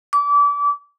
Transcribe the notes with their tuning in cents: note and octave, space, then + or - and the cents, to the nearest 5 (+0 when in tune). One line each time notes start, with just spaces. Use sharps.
D6 -30